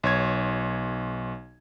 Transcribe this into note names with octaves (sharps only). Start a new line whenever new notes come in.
B1 C#5 G#6